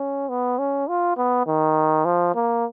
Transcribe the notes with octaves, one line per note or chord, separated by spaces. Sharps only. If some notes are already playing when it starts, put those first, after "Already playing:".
Already playing: C#4
B3
C#4
F4
B3
D#3
F3
A#3